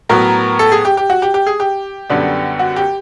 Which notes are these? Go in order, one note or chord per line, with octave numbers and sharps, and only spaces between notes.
A2 F#3 B3 A#4
A4
G#4
G4
G4
F#4
G4
G4
G#4
G4
F#2 D3 G3 B3 D4
F#4
G4